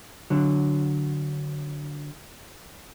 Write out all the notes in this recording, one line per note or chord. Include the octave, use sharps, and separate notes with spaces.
D3 F#3